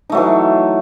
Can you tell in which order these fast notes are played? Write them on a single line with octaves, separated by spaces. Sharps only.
D#4 A3 F#3 E3